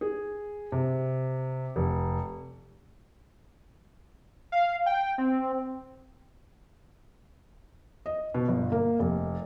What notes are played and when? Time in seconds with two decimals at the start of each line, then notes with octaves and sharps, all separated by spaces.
0.01 G#4
0.72 C3
1.76 F1
4.52 F5
4.86 G5
5.18 C4
8.06 D#5
8.34 B2
8.48 G1
8.72 A#3
8.99 F1